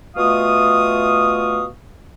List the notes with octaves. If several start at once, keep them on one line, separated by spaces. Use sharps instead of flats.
B2 A3 F4 F5 C#6 D#6